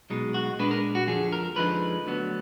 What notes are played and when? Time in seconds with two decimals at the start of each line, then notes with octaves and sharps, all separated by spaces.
0.10 B1 B2 G#3 D#4
0.34 F#4
0.59 A#2 G#3 D4 B4
0.71 A#4
0.95 F#4
1.08 F2 D3 F3 G#4
1.32 A#4
1.56 F2 D3 F3 G#3 D#4 B4
2.06 D2 D3 F#3 B3